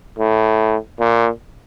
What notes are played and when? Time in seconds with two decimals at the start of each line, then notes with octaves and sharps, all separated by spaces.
0.19 A2
1.00 A#2